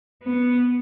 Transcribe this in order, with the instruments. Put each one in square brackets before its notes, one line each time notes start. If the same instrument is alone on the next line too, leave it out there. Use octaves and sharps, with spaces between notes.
[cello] B3